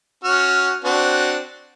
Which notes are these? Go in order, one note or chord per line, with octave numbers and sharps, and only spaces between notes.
C#4 F#4 F6
C4 D4 F#4